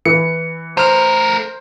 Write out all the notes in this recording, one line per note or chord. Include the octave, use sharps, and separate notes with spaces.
E3 C#7
A3 A#4 C5 F6